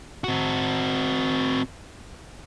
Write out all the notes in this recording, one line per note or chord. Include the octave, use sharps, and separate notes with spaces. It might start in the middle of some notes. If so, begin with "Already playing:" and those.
C4 F#4